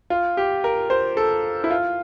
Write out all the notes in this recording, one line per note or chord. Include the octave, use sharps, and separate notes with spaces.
F4
G4
A#4
C5
A4
E4
F4